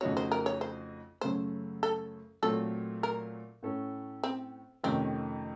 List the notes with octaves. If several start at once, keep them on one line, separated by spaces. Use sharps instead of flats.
F2 C#3 A3 D#4 F#4 C#5
C5
A#4
C#5
C5
F#2 C#3 A3 C5
A4
A#2 F#3 A3 C4 A4
A#4
A2 A3 C#4 A4
C4
F2 C3 D#3 A3 C4 C#4